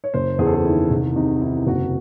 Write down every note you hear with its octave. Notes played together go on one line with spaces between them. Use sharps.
C#5
F#1 C5
E2 G#4
A4
G#4
D#3 E4
C2
C3 D#4
D#3 E4
F#1 F#4